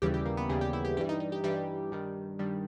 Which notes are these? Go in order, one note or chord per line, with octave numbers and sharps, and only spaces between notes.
D#2 C#3 E3 G3 G4
G4
A#3
B3
D#2 C#3 E3 G3 G#4
G4
E4
G4
G2 E3 G3 G4
D#4
D#4
G4
G2 E3 G3 G4
G2 D#3 G3
G2 D#3 G3